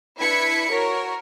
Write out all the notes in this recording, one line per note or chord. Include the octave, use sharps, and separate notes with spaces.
D4 E4 B4 G#6 B6 C#7
F#4 A#4 C#5